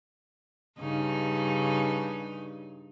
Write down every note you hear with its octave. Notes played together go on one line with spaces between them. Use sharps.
G2 C#3 D#4